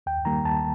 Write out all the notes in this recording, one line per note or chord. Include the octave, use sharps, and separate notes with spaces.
D#2 G5
D#3 G3 A#3 A#5
D#2 A5